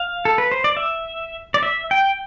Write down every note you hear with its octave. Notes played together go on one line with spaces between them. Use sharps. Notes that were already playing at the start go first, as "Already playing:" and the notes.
Already playing: F5
A4
B4
C5
D5
E5
D5
E5
G5